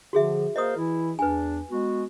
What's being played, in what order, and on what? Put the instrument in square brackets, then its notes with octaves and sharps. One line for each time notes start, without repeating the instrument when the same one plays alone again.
[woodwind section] D3 F3 [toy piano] F#4 G#4 E5
[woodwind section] A#3 A#4 C5 [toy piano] D#5 D#6
[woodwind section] E3 E4
[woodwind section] E2 D4 [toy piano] B4 G#5
[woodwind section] G#3 B3 F#4